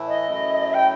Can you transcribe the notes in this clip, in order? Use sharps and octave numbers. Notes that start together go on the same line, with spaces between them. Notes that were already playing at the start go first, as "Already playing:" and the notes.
Already playing: A2 E3 A3 E4
D#5
F#2 F#3 A3 E4
G5